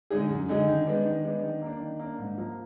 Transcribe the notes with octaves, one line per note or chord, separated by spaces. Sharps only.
D3 G#3 D#4 G#4
F#2
D3 G#3 D#4 G#4
D#3
G#3 B3 D4
D#3
G#3 B3 D4
D#3
A#3 D4
D#3
A#3 D4
G#2
F3 A#3